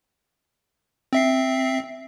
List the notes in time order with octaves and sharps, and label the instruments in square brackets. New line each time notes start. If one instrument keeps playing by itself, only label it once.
[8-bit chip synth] C4 E5 C7